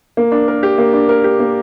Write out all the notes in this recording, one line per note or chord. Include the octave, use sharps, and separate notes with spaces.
A#3
D4
A#4
G4
A#3
D4
A#4
G4
A#3